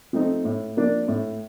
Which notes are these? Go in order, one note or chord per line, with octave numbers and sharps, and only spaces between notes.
F3 A3 C4 D#4
A2
F3 A#3 D4
A2